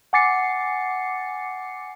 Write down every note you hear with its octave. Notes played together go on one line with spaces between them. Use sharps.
F#5 G#5 D6 A6 C7 C#7